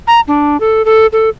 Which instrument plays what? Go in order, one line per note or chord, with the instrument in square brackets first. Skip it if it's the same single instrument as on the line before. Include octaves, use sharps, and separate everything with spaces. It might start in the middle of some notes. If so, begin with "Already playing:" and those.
[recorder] A#5
D4
A4
A4
A4